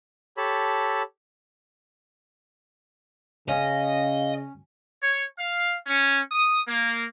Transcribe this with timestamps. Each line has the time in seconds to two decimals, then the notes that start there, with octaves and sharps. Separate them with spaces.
0.37 G4 A4 C#5 A5 B5 E6
3.49 C#3 C#4 D#5 F5
5.02 C#5
5.38 F5
5.87 C#4
6.32 D#6
6.68 A#3